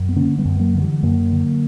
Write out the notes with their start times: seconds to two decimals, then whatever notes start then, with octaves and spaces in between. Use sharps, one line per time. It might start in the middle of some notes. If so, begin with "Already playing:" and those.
Already playing: F#2
0.09 B3
0.16 D3 A#3 C#4
0.38 G3 B3
0.45 F#2
0.59 F#3 A#3
0.75 D3 A#3
0.81 E3 G3
1.03 F#2 F#3 A#3
1.32 D3